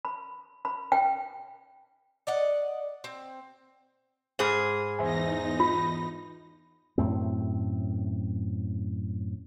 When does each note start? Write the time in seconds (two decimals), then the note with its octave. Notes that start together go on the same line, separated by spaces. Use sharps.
0.05 B5
0.65 B5
0.92 G5
2.27 D5 D#5 F#5
3.04 C4
4.39 G#2 G#4 C5 B5 F6
4.99 E2 D#4 C5 E5 G#5 A#6
5.60 F4 B5
6.98 F#2 A2 C4